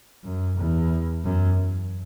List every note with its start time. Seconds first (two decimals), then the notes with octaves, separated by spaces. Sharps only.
0.24 F#2
0.57 E2
1.24 F#2